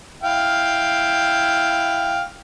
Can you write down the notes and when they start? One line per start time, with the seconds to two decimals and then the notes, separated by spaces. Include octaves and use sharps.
0.23 E4 F5 G5